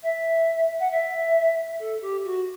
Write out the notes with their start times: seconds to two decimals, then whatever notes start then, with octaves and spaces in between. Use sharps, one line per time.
0.03 E5
0.79 F#5
0.90 E5
1.79 A4
2.01 G4
2.24 F#4